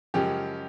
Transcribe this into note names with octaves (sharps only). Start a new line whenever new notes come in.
F#2 C#3 F3 G#3 G4